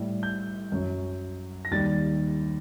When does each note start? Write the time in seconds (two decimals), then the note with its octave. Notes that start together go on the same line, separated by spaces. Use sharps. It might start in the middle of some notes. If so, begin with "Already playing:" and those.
Already playing: A2 G3
0.23 G6
0.72 F#2 F#3
1.65 A#6
1.71 D#2 D#3 G3 A6